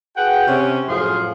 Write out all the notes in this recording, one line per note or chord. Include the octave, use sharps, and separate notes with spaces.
F#4 G#4 B4 F#5 G5
C3 C#4
F#2 A2 F3 G#4 F5 C6